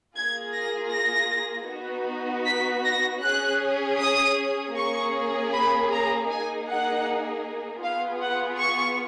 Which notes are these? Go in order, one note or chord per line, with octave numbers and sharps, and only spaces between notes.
A#3 F4 G#4 G#6
A#6
A#6
B3 D#4 F#4
B6
A#6
C#4 G#4 F#6
D#6
A#3 C#4 G#4 C#6
B5
A#5
A#3 D#4 G#4 G#5
F#5
B3 F4 G#4 F5
F#5
C#6